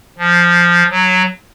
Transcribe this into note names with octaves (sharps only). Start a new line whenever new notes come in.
F3
F#3